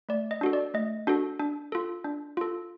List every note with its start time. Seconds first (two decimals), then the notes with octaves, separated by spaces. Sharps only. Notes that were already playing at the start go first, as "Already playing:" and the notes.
0.09 A3 D5
0.31 D#5
0.41 D4 F#4 A4
0.53 D5
0.74 A3 D#5
1.07 D4 F#4 A4
1.39 D4
1.72 F4 A4
2.04 D4
2.37 F4 A4